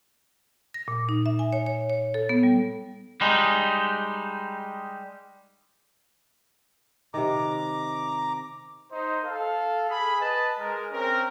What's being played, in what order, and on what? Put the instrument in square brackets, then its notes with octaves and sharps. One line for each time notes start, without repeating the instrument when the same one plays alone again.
[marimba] A#6
A#2
D#4
E5
G#5
C#5
C#5
C#5
A4
B3
G3
[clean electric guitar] G3 G#3 D#4
[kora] C3 D#3 [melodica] A#5 D6
[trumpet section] D#4 C5
A4 F5
G#4 B5
B4 D#5 A5
G#3 A#4
C4 C#4 A#4